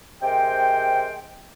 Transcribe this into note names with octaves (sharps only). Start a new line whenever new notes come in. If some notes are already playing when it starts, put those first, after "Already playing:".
C3 G#3 A#4 C5 G5